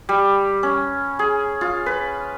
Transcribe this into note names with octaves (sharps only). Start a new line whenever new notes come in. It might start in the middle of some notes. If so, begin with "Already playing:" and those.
G3
C#4
G#4
F4
B4